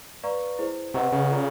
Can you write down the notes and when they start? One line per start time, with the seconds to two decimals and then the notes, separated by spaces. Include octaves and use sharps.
0.23 B4 D5 F5 A#5 C#6
0.59 E4 G#4 C5
0.94 C3 B4 D#5 F#5 A#5 C#6
1.12 C#3
1.30 F4 A4 D5 F5 A#5